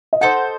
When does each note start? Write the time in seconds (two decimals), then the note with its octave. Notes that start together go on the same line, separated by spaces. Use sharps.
0.13 D#5
0.21 D#4 A4 C5 F#5